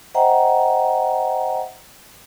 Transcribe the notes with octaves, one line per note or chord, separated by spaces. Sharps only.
C5 D#5 E5 F#5 G5 A#5